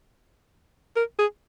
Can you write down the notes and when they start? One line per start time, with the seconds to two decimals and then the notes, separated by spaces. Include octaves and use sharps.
0.96 A#4
1.19 G#4